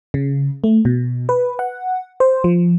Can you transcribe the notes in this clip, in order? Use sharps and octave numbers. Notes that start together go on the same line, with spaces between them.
C#3
A3
B2
B4
F#5
C5
F3